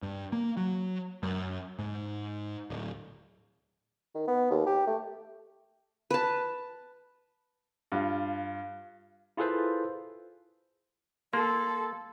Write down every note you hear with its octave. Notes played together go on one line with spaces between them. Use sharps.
G2
A#3
F#3
F#2
G#2
D1
D#3
B3
D#2
G4
A3
B4 A5
G2 F4
E4 F4 G#4 A4 B4 C5
A#3 A4 C6